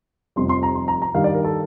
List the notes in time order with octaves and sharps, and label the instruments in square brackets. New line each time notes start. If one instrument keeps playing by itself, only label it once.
[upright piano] F1 F2 C3 G3 C6
C6
A#5
C6
A#5
A#5
G2 D#3 G3 F5
D5
A#4
A4